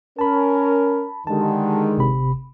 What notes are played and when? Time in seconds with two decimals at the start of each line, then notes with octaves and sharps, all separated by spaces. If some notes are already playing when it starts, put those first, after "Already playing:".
0.19 C#4 A#4 A5 B5
1.27 D3 D#3 G#3 G4 A5
1.97 G1 C3 B5